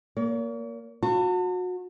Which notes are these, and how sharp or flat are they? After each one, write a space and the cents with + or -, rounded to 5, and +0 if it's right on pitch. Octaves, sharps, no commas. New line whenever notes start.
A#3 +0 C#5 +45
F#4 -30 A5 +35